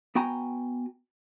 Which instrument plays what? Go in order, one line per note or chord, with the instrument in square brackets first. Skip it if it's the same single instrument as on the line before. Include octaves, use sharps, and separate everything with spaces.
[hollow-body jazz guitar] B3 F#4 G5 G#5 A#5